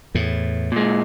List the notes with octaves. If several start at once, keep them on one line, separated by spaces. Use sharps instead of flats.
E2 A2
A#2 G#3